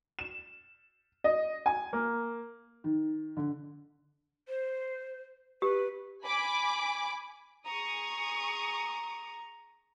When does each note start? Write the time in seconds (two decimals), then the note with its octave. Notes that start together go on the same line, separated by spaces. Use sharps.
0.19 E7
1.24 D#5
1.66 G#5
1.93 A#3
2.84 D#3
3.37 D3
4.48 C5
5.62 G4 B4
6.24 G#5 B5 D6
7.65 G#4 A#5 C#6 D#6